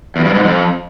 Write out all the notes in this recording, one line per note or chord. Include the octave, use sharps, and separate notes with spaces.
E2
G2
G#2
F2